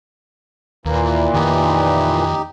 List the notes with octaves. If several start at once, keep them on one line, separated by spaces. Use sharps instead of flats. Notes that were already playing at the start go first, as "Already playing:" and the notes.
D#2 A#2 E3 A#3
F2 D#3 D#4 G4